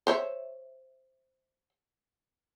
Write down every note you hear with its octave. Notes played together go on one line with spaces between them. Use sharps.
C5 C#5 E5